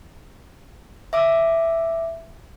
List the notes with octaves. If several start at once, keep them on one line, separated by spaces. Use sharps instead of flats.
E5 D6 E6